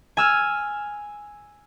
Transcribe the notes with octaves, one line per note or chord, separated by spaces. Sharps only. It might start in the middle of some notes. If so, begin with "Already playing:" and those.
G#5 E6 F6